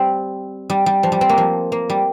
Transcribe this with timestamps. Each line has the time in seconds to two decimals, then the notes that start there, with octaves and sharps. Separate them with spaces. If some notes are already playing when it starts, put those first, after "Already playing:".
Already playing: G3 C4
0.70 G3
0.86 G3
1.03 F3
1.12 G3
1.21 C4
1.29 A#3
1.38 F3
1.72 A#3
1.90 G3